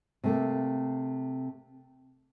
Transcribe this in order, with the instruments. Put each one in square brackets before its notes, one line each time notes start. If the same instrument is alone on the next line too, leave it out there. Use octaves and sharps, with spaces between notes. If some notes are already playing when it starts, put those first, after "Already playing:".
[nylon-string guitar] C3 A3 A#3